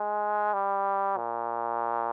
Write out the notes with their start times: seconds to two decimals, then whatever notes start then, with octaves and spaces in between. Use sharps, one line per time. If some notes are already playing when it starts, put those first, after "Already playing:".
Already playing: G#3
0.53 G3
1.17 A#2